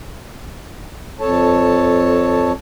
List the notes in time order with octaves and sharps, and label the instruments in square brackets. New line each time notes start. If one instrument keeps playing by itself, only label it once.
[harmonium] F2 A4 C#5 A5